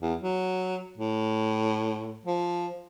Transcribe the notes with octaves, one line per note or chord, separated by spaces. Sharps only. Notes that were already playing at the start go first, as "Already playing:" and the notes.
E2
F#3
A2
F3